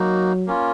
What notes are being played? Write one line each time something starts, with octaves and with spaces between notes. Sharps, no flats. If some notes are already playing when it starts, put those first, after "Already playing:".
Already playing: F#3 A#3 D#4 F#4
A#3 C#4 F4